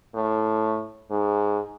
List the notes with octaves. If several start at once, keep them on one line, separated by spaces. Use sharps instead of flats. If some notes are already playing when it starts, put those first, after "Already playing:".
A2
G#2